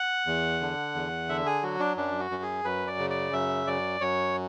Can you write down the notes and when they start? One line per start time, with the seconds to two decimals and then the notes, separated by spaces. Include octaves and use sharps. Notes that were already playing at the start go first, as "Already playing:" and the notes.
Already playing: F#5
0.26 E2
0.61 D3
0.95 E2
1.29 D3 E5
1.46 G#4
1.63 F#3 F#4
1.80 D4
1.97 F#2 D4
2.20 F#4
2.31 F#2
2.42 G#4
2.65 F#2 B4
2.87 D5
2.99 C#3
3.10 D5
3.33 F#2 E5
3.67 F#2 D5
4.01 F#2 C#5